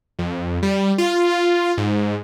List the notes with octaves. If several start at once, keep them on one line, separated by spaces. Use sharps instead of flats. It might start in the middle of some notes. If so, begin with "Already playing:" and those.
F2
G3
F4
G#2